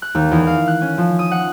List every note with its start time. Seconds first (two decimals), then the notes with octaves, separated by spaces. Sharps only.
0.02 F#6
0.15 D#2
0.32 E2
0.47 F5
0.68 F#6
0.82 C#4
0.98 F3
1.19 D#6
1.31 F#5